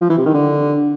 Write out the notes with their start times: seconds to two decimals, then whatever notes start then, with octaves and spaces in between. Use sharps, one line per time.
0.01 F3
0.09 E3
0.17 C3
0.26 D#3
0.34 D3